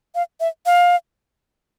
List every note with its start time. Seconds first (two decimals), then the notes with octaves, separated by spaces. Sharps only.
0.15 F5
0.40 E5
0.66 F5